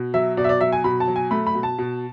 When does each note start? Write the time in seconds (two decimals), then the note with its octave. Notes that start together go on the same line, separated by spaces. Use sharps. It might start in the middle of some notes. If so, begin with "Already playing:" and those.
Already playing: B2
0.14 F#3 E5
0.37 B2 D5
0.44 E5
0.49 D5
0.60 F#3 E5
0.72 G#5
0.84 B2 B5
1.00 A5
1.08 F#3
1.16 G#5
1.31 A3 B5
1.47 B5
1.55 B2
1.63 A5
1.78 B2